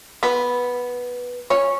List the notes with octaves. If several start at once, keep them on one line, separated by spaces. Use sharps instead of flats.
B3 B4
C#4 C#5